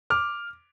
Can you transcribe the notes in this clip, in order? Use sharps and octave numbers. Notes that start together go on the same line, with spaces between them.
D6 F6